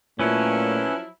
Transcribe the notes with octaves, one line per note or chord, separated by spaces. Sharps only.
A#2 F3 F#3 A3 C#4 E4 B4 C#5